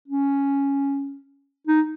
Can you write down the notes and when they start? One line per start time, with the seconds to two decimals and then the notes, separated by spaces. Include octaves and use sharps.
0.08 C#4
1.67 D#4